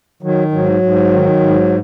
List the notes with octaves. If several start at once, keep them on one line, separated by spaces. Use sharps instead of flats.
D#3 F#3
G#2 F#3
G#2
D#3
G#2